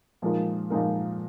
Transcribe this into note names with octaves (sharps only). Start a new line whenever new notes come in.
A#2 F3 G#3 D#4 A#4
A#2 F3 G#3 D#4 A#4